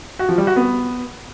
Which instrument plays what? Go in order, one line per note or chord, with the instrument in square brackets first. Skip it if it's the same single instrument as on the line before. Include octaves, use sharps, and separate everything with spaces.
[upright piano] F#4
F3
G3
F#4
B3